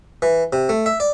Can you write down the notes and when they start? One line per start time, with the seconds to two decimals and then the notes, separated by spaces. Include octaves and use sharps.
0.22 E3
0.53 C3
0.69 A3
0.86 E5
1.00 D5